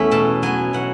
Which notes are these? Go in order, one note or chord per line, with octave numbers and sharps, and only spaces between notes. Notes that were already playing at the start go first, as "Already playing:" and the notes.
Already playing: E2 A3 C#4 E4 E5
B2 A5
F#3 B3 G#5
B2 F#5